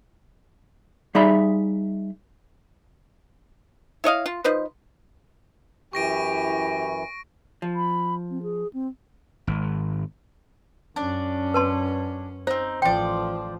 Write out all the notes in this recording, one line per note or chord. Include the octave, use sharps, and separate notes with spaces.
G3 D#4 G#4 D5 E5 B5
E4 C#5 D#5 F5
F4
F3 D#4 B4 C5
F#2 E3 E4 G4 C#6 A#6 D7
F3
B5
C4
G#4
C4
G#1
F#2 C#4 D4 D5
B4 A5 C6
C4 D#4 C5
A1 F3 C5 D5 G5